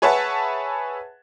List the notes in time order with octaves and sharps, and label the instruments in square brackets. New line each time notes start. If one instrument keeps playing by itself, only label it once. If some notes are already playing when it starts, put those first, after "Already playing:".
[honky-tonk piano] G#4 B4 C#5 E5 F#5 A5